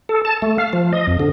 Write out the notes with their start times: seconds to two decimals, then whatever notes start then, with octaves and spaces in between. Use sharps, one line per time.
0.09 A4
0.25 A5
0.42 A3
0.58 F5
0.73 F3
0.93 D#5
1.07 F2
1.20 D3